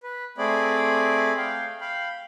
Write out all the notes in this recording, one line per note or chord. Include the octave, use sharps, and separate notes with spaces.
B4
A3 C4 G#4 D5 B5
F5 G5
F5 G5 B5